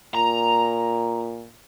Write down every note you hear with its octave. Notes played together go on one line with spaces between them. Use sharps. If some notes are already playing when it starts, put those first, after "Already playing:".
A#2 A#5